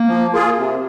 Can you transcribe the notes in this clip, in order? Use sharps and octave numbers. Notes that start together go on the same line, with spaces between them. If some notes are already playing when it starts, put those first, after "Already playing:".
Already playing: A#3
F3
A#3 F4 G#4
C3